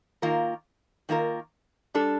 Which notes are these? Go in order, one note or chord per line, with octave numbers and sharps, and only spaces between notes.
D#3 A#3 F4 A#4
D#3 A#3 F4 A#4
G3 D4 A4